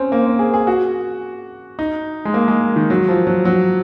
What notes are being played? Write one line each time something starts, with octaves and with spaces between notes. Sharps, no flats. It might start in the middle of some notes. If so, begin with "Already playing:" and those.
Already playing: C4 C#4
A#3
C4
G#4
G#4
F#4
D#4
G#3
A#3
G#3
D#3
F#3
F3
F#3
F#3